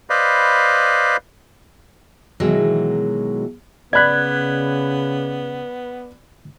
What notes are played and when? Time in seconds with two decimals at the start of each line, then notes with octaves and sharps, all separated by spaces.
0.10 B4 C5 D5 D#5 F5 B5
2.40 B2 D#3 E3 F#3 G#3
3.93 C#3 B3 D5 B5 F#6 G#6 B6